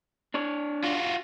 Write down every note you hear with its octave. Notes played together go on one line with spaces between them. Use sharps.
D4 C#5
F4 F#4